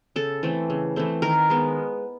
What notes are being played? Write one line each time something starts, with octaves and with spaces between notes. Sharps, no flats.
C#3 A4
E3 A3 C4
C#3
E3 A3 C4
D#3 A#4
G#3 B3